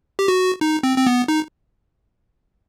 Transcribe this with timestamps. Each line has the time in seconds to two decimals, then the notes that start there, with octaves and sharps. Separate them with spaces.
0.19 G4
0.28 F#4
0.61 D#4
0.83 C4
0.98 C4
1.07 B3
1.28 D#4